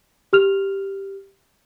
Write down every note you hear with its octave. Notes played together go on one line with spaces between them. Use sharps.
G4 F6 F7